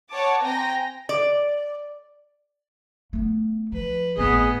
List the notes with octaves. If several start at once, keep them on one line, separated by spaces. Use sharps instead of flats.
C#5 F#5 A5 D6
C4 G5 G#5 A#5 A#6
D5
A3 B3
F3 B4
G#1 A2 B3 G#4 D#5